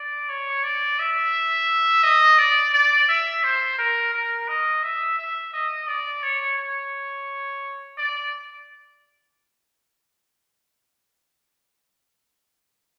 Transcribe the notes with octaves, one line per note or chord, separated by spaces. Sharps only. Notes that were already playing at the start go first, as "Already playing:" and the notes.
Already playing: D5
C#5
D5
E5
D#5
D5
D5
E5
C5
A#4
A#4
D#5
E5
E5
D#5
D5
C#5
C#5
D5